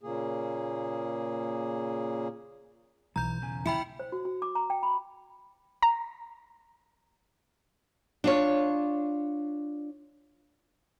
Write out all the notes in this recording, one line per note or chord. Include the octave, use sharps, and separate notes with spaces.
A#2 C#3 A#3 G#4
B1 E3 A#5 G6
E2 C#3 G#5
E4 G5 B5 C#7
C5
F#4
F#4
D6
A#5
G5
B5
A#5
D4 F4 C#5